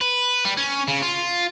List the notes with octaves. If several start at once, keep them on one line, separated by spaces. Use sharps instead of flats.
B4
G3
C#4
C#3
F4